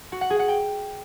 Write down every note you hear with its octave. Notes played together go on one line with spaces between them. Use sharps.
F#4
F#5
G#4
F#5
G5